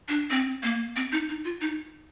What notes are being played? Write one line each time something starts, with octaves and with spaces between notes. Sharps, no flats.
D4
C4
A#3
C4
D#4
D#4
F4
D#4